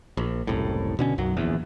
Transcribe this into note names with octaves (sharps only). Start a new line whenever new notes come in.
A#1
F#1 C2 A2
B2 D3 C#4
B1 F#2 F#3
D1 A#1 E2